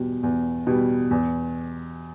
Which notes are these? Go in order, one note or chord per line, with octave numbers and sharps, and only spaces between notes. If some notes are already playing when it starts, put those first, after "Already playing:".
Already playing: E2 B2 G3
E2
B2 G3
E2